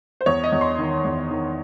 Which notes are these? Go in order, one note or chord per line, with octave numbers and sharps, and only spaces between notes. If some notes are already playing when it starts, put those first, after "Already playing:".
C5
E2 C#5
D#5
E2
C6
D#3
E2
D#3